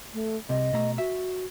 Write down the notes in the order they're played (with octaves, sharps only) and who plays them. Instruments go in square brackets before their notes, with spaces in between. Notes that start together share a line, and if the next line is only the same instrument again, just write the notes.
[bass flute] A3
[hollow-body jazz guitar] C2 C3 [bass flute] D#5
[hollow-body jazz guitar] B2 A3 A#5
[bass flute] F#4 [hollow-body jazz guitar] E5